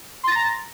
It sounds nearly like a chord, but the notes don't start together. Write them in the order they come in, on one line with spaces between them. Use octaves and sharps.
C6 A6 A#6 A#5